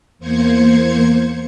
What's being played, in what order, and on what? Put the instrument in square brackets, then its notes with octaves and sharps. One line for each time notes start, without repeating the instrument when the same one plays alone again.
[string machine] E2 A#3 C5 G#6 C#7